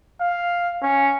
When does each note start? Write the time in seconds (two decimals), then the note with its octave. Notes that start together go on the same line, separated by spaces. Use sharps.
0.21 F5
0.82 C#4